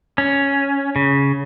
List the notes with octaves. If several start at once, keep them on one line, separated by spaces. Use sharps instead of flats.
C#4
C#3